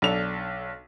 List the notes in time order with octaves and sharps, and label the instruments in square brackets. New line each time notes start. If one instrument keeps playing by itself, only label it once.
[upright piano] B1 D4 A4 F7